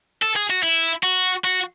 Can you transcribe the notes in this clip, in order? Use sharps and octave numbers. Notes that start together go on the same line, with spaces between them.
A4
G#4
F#4
E4
F#4
F#4